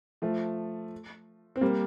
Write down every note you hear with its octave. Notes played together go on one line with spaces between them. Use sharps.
F3 A3
C4
G3 A#3